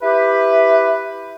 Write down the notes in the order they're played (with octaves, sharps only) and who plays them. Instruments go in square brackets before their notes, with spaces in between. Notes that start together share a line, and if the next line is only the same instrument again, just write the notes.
[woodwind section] E4 G4 B4